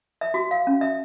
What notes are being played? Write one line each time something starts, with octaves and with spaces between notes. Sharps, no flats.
E5
F#4
F5
C#4
E5